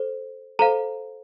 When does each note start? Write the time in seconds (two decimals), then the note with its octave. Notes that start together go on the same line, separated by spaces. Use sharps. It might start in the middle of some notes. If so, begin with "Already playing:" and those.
Already playing: A4 C5
0.59 A4 C5 F5 A#5